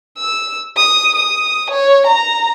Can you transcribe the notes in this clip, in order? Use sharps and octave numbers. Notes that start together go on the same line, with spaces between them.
E6
D#6
D#6
C#5
A#5